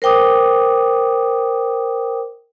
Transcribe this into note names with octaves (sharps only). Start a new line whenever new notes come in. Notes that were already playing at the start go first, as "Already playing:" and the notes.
A#4 C5 G5 D6 D#6